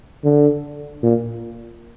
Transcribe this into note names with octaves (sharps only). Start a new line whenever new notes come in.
D3
A#2